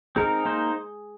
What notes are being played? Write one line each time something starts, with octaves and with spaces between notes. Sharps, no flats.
C4 D#4 G#4 A#4
A#3 D#4 C5